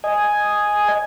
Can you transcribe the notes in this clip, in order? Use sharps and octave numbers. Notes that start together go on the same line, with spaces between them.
D#5 G#5